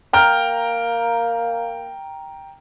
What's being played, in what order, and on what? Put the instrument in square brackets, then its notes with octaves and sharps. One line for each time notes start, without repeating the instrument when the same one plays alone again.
[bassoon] A#3 [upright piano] G5 A#5 F6